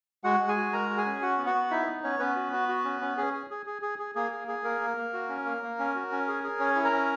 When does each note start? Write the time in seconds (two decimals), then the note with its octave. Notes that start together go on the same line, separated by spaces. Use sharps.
0.24 G#3 F#4 F#5
0.40 G#3
0.48 G#4 G#5
0.57 F#4
0.72 G#3 A#4 A#5
0.90 F#4
0.97 G#4 G#5
1.05 C#4
1.22 F#4 F#5
1.38 B3
1.46 F#4 F#5
1.55 B3
1.71 D#4 E4 E5
1.87 B3
2.03 B3 C#4 C#5
2.19 B3 C#4 B4
2.36 F#4
2.52 F#4
2.69 F#4
2.84 C#4
3.01 C#4
3.17 C#4 G#4
3.33 G#4
3.50 G#4
3.66 G#4
3.82 G#4
3.99 G#4
4.15 A#3 G#4
4.32 G#4
4.48 G#4
4.64 A#3 A#4
4.81 A#3
4.97 A#3
5.13 F#4
5.29 C#4
5.45 A#3
5.63 A#3
5.79 C#4
5.95 F#4
6.11 C#4
6.28 G#4
6.44 G#4
6.60 C#4 C#5
6.76 E4
6.84 A#4 A#5
6.92 C#4